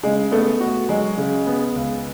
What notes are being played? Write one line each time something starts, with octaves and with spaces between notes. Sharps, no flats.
C#3 G#3
A3 B3
F#4
F#3 G#3
C#3
B3
C#2